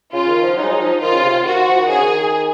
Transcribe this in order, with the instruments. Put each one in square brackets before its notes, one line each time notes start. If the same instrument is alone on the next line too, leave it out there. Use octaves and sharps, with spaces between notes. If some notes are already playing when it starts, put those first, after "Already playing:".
[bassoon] C#3 [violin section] F4
[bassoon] D#3
F3
[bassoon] F#3 [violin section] D#4
[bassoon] G#3
F#3
F3
[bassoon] D#3 [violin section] F4
[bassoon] C#3
C3
[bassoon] D#3 [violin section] F#4
[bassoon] F3
D#3
[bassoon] C#3 [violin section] G#4
[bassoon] D#3